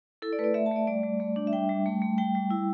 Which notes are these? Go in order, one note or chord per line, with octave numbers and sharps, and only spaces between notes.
E4 A4
D5
A3 B4
D5
A3 E5
A5
A3 D5
G3 D5
G3
A3
D4
E5
G3 G5
G3
A3
A3
G3 G5
G3
E4